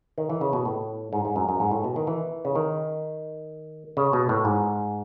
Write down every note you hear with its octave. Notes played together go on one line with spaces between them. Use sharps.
D#3
E3
C#3
B2
A2
G#2
G#2
F#2
F#2
G#2
A2
B2
D#3
E3
C#3
D#3
C#3
B2
A2
G#2